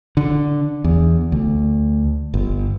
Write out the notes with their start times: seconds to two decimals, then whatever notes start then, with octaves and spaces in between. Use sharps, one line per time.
0.17 D3
0.84 E2
1.32 D2
2.34 G1